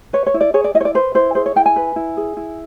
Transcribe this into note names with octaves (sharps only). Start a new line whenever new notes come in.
B4 C#5
C#5
E4
D5
G#4 C#5
D5
E4 D#5
C#5
D5
B4 C5
E4 C5
G#4 C5
C#5
E4 G5
G#5
B4
E4
G#4
E4